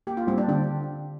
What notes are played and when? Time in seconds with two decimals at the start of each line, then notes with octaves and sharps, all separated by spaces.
0.07 A#3 G4
0.17 F4
0.27 G3 C4
0.38 D4
0.48 D3 G4